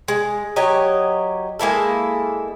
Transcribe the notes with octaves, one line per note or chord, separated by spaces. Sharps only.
G#3
F#3 G4 C#5 D#5
G#3 A#3 E4 A4